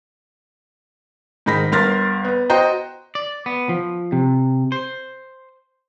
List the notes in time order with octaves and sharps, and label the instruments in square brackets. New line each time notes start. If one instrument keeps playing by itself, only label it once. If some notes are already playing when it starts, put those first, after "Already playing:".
[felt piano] G#2 D#3 B5 A#6 B6
G1 A#4 C6 F6 A6 A#6
B3
F#4 C5 D#5 G5 A#5
[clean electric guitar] D5
B3
F3
C3
C5